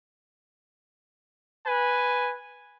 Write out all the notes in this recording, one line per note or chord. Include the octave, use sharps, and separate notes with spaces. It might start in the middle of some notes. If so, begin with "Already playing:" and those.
B4 G#5